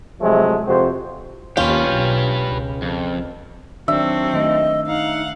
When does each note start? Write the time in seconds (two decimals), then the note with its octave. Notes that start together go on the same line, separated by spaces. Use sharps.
0.21 C3 F3 F#3 G#3 A3
0.66 F2 C3 F#4 C5
1.57 D#2 C#4 F4 G4 B4
1.91 B1
2.47 C#2
2.82 F2
3.88 D#3 F#3 C4 D4 E5
4.33 D#3 A3 D#5
4.87 D#4 F5 F#5